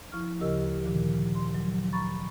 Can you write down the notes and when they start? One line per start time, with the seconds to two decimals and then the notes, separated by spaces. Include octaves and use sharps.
0.12 F3 E4 C#6 F6
0.40 D2 C#3 G4 A#4 D#5 E6
0.84 A#2 D3 D#3 F3
1.35 C6
1.55 F#3
1.93 A#5 B5 C#6 A6